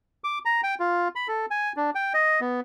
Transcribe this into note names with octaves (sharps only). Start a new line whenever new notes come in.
D6
A#5
G5
F4
B5
A4
G#5
D4
G5
D#5
B3